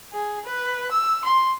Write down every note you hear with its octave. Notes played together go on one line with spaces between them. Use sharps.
G#4
B4
E6
C6